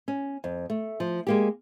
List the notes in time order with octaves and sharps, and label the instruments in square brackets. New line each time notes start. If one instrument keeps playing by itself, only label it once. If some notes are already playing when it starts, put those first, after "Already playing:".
[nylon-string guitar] C#4
F2
A3
F3
G#3 A#3 G4